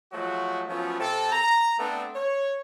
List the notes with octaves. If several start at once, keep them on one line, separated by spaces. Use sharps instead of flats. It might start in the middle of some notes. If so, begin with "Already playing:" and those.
F3 F#3 G#3 A3 F#4
F3 F#3 A3 B3 C#4
C3 C4 A4
A#5
A3 B3 C4 D4
C#5